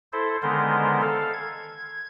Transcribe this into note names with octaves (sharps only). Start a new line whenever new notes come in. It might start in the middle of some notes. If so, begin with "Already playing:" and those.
E4 A4 C5
D3 D#3 G#3 B3 A#4 C5
A4 F5
G#6